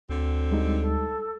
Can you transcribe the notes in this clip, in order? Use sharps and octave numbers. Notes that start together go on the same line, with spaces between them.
D2 D3 F#3 C4
G3 G#3 D#4
A4